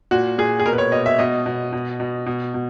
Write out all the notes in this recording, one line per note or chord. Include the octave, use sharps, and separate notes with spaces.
A#2 F#4
A#2 G#4
G#4
B2 A#4
B4
C#5
B2 D#5
E5
B2 D#5
B2
B2
B2
B2
B2